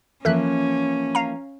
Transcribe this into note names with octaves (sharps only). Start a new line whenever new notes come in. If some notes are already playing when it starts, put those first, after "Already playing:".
E3 F3 A#3 C#4 A4 E5 F#6
F5 A#5